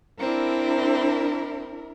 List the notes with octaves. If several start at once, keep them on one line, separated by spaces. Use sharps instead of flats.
C4 D4 E4 A#4